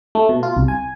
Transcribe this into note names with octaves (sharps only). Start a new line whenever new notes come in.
A3
B2
F4
C2
G#5